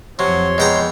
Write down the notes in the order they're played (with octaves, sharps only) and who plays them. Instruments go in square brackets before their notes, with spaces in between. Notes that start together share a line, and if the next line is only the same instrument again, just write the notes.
[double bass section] F2 F3 [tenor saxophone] C3 [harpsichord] F#3 [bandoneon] C#5 C6
[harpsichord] E2 G5 A#5 [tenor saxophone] G#3